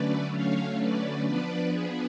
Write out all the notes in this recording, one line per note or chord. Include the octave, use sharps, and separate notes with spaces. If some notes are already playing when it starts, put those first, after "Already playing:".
Already playing: D3 F#3 A3 C#4 B4 D5
C#5 F5
B4 D5
F3 B3 D4 B4 D5
G#4 B4